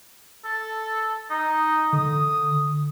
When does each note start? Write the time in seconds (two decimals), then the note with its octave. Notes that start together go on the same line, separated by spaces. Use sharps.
0.45 A4
1.30 D#4
1.93 D3 D#6